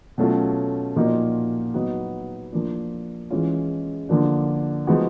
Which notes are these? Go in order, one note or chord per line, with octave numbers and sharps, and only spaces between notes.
B2 F#3 A3 C#4 F4
A#2 F3 A#3 D#4 F#4
F#3 B3 D#4 F#4
F3 A#3 D4
E3 G#3 C#4 F4
D3 F3 A#3 D4
F3 G#3 B3 D#4 F#4